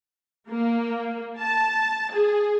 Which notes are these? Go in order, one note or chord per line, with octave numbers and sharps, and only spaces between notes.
A#3
A5
G#4